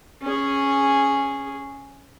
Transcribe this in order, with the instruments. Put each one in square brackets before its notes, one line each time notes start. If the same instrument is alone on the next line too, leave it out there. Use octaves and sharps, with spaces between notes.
[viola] C#4 G#4